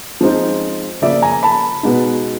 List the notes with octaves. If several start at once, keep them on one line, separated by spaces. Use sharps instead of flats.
F3 G#3 C4 D#4
C#3 F3 A#3 D5 E5
G#5 A#5
A5 B5
B2 G#3 B3 D#4